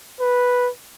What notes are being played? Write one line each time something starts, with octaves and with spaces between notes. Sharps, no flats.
B4